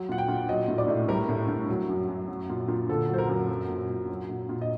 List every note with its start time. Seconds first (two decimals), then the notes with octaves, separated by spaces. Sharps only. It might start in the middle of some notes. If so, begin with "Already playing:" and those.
Already playing: F#3
0.09 A#2 F#5
0.18 G5
0.28 A#2
0.49 F#3 D#5
0.68 A2
0.78 D5
0.88 A2
1.08 G3 A#4
1.29 A2
1.48 A2
1.69 F#3
1.89 F#2
2.08 F#2
2.28 F#3
2.49 A#2
2.68 A#2
2.89 D3 A4
3.08 F#3 C5
3.18 A#4
3.28 F#2
3.48 F#3
3.68 A#2
3.89 A#2
4.10 F#3
4.29 A#2
4.49 A#2
4.61 D#5